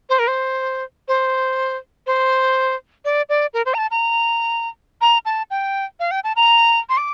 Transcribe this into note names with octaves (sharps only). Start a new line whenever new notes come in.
C5
A#4
C5
C5
C5
D5
D5
A#4
C5
A#5
A5
A#5
A#5
A5
G5
F5
G5
A5
A#5
C6
D6